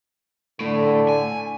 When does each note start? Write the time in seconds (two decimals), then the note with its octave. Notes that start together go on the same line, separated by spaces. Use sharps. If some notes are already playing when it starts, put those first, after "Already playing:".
0.61 A2 D3
1.09 G#5